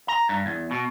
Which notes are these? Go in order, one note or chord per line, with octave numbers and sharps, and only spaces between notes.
A#5
G2
E2
B2